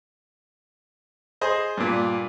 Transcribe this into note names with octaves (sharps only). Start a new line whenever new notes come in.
G#4 C5 D#5
G2 A#2